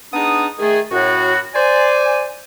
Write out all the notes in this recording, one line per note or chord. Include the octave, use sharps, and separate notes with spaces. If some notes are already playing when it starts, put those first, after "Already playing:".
G#3 B3 D4 D#4 D#6
D#3 A3 G#4
F#2 A2 F#4
C5 D5 G#5